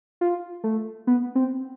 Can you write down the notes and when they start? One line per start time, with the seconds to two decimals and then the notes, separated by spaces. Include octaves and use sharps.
0.21 F4
0.64 A3
1.07 B3
1.35 C4